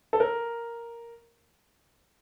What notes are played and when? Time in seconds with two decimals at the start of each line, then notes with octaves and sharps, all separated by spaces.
0.13 A4
0.20 A#4